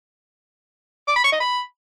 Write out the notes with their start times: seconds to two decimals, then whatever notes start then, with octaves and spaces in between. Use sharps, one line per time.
1.08 D6
1.16 B5
1.24 C#6
1.32 D#5
1.40 B5